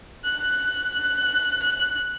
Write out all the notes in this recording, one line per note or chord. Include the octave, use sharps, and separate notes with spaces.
F#6
F#6
F#6